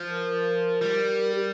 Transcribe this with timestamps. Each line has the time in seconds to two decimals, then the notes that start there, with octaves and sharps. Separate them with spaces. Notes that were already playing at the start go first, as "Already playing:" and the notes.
Already playing: F3
0.09 A#4
0.81 G3
1.33 G4